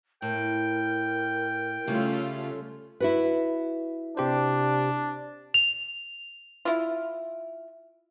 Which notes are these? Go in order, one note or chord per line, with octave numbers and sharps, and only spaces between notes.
A2 A#4 G5
C#3 G3 A3 C#4 F4
E4 F#4 B4
C3 D4 G4 C5
F7
E4 F4